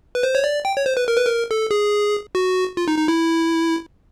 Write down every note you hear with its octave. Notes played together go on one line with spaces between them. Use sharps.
B4
C5
C#5
D5
G5
C#5
C5
B4
A#4
B4
A#4
A4
G#4
F#4
F4
D#4
D#4
E4